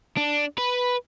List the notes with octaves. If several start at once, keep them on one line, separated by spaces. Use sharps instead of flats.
D4
B4